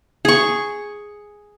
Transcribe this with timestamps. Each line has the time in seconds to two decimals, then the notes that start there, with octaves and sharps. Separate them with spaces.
0.25 G#4 C#6